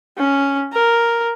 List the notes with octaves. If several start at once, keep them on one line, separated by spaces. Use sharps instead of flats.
C#4
A#4